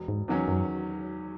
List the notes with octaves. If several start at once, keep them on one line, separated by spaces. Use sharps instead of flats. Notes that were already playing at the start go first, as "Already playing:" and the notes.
Already playing: E1
G#2
E2 D#3 F#3 C#4
F#2